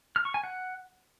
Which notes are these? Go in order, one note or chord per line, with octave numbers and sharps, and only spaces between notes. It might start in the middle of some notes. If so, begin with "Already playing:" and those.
F6
C#6
G#5
F#5